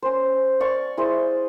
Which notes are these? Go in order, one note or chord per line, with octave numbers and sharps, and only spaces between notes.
C#4 C5
D5 F5 C#6
E4 G#4 C5